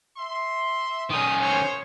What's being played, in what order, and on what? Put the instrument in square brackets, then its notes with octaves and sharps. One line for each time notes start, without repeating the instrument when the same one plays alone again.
[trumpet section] E5 C6
[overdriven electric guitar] D#3 C#4 [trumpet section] D#4 [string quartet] D#6
[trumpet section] C5 [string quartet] C#5